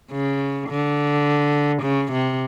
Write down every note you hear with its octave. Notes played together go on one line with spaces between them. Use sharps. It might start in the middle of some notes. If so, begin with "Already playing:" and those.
C#3
D3
C#3
C3